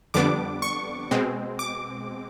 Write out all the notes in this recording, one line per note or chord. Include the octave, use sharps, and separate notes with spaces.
F2 D3 G3 B3 D4 D6
C#6
B2 G#3 C4
D6